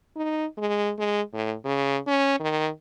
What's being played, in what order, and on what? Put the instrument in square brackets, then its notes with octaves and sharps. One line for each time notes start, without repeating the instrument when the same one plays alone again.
[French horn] D#4
G#3
G#3
A2
C#3
C#4
D#3